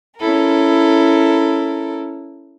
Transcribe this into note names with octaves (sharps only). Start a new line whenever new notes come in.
C#4 E4 A4 A#4